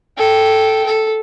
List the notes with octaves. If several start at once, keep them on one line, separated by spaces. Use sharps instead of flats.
A4 G5
A4